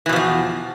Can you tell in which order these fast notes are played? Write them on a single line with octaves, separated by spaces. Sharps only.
E3 B2 F3 E2